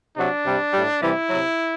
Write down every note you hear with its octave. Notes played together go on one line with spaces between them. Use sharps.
C3 F#3 D4
C3 G3
A2 G3
C3 E3 G3 E4
C3 F#3